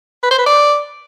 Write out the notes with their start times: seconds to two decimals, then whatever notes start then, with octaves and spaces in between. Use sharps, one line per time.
0.23 B4
0.31 C5
0.39 B4
0.46 D5